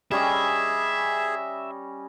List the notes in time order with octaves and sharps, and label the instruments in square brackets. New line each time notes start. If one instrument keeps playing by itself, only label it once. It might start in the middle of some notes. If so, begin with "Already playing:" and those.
[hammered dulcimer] G3 C#4 D#5 [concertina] G#4 [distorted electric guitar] E5